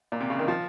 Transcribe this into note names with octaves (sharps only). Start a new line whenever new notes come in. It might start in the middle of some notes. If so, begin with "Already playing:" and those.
A#2
C3
C#3
D#3
F3